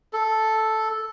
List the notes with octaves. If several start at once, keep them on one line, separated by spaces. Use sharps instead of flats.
A4